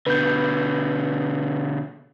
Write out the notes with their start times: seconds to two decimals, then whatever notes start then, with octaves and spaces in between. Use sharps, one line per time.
0.07 B2 D3 B4 G6